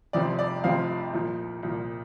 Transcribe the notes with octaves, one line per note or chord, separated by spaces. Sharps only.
F1 F2 C3 F3 C4 D5
D5
F1 F2 C3 F3 C4 F5
C2 A#2 F3
C2 A#2 F3